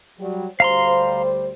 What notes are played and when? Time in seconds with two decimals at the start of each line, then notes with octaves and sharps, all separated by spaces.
0.20 F#3 G3
0.60 D2 G3 C5 F5 A#5 C6